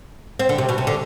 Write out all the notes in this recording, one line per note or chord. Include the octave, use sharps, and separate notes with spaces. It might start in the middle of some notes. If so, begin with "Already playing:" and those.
C4
D3
C3
B2
C3
D3